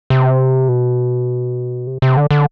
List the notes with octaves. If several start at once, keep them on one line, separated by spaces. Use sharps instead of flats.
C3
B2
C3
C3
D3
D3